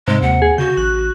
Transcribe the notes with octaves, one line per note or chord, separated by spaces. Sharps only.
G#2 C3 G#3
D#2 F#5
G#4
C#3 F#4 G6
A1 F#6